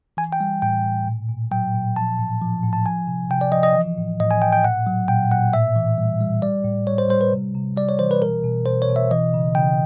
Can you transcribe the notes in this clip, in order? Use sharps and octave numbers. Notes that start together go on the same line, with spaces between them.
E3 G#5
G5
G3
A2 G5
A2
A#2
A#2
F#3 G5
A#2
F3 A5
A2
F3
A2
A5
F3 G#5
C3
C3 G5
D5
F3 D#5
D#5
E3
A2
A2 D#5
G#5
A2 G5
G5
A#2 F#5
F#3
A#2 G5
A#2 F#5
A2 E5
E3
G3
G3
G3 D5
A2
G3 C#5
C5
G3 C5
B4
C3
C3
G3 D5
C#5
E3 C5
B4
B2 A#4
B2
B2 C5
C#5
B2
E5
E3 D#5
C#3
C#3 G5